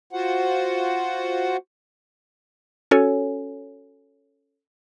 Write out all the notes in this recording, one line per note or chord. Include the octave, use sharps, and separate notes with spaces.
F4 F#4 C5 F#5
C#4 F#4 A4 C#5 G#5